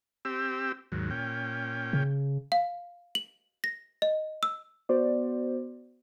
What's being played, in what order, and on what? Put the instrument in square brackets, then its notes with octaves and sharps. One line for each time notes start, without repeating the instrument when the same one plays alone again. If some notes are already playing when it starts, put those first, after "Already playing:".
[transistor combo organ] C4 G4 E6
D#2 G#2 F#3
A#2 C#4 G5
[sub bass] C#3
[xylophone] F5
F#7
A#6
D#5
E6
[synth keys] B3 F#4 C5 D5